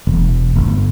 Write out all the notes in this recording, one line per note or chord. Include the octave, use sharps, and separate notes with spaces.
E1
G1